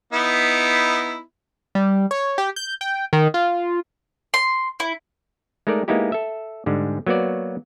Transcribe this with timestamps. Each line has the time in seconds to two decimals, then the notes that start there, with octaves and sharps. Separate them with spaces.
0.13 B3 D#4 E4
1.75 G3
2.11 C#5
2.38 G4
2.56 G6
2.81 G5
3.13 D#3
3.34 F4
4.34 C6
4.80 E4
5.67 G#3 A3 D#4 A#4 D5
5.88 G#3 A#3 B3 D#4 E4 G4
6.12 A4 E5
6.66 G#2 D3 G3 G#3
7.07 F#3 A#3 B3 F#4 D5